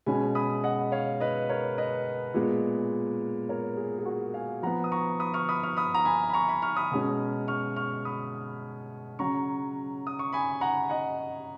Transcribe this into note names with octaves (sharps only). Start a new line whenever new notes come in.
B2 G#3 C#4 G#5 B5
B5 D#6
D#5 F#5
C#5 F5
B4 D#5
A#4 C#5
B4 D#5
A#2 G#3 B3
A#4 C#5
G#4
G#4
F#4 A#4
F5 G#5
F3 B3 F#5 A#5
D#6
A#5 C#6
B5 D#6
C#6 F6
B5 D#6
C#6 F6
B5 D#6
A#5
G#5 B5
B5
A#5 C#6
G#5 B5
C#6 F6
B5 D#6
B2 G#3 C#4
C#6 F6
C#6 F6
B5 D#6
C#3 F#3 C#4 A#5 C#6
D#6
C#6
G#5 B5
F#5 A#5
D#5 F#5